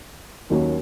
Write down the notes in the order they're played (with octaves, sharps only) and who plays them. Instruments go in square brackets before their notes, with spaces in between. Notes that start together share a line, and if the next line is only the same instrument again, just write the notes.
[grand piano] D#2 D#3 F#3 A#3 C#4